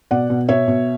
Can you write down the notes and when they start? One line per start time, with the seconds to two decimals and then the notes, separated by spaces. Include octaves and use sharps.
0.11 B2 D5 F#5
0.30 B2
0.48 B2 C#5 E5
0.68 B2